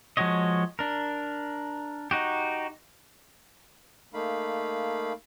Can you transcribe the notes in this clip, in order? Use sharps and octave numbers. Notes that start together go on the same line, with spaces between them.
F3 G#3 F#4 C#5 D#5
D4 A#4
D#4 F#4 G4
A3 A#3 D#4 F5 B5